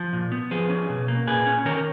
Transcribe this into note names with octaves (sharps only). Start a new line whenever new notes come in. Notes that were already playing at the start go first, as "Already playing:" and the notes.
Already playing: F3
A#2
B3
F3 G#4 B4
C#4
B2
A#3
A#2 G#4 B4
C#4
D#3 A#4 C#5